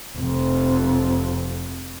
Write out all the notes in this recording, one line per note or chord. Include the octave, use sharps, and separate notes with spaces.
F1 F2